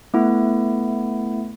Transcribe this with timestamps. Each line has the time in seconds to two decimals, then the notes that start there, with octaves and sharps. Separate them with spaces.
0.14 A3 B3 E4